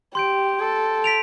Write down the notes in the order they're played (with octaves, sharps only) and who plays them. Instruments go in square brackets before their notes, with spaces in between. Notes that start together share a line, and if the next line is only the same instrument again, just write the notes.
[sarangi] G4 [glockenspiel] C6 G6 D7
[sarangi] A4
[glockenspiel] B6 D7 F7